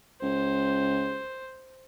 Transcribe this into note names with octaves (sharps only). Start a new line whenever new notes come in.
C#2 C5